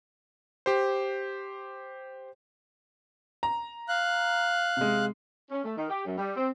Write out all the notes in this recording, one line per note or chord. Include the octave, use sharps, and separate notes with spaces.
G4 C5
A#5
F5 F#6
C3 G#3
C#4
A3
D#3
G4
F#2
G3
C4